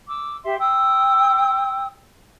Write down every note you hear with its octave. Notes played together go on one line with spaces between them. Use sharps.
D6 E6
G4 E5 C6
G5 C6 D#6 E6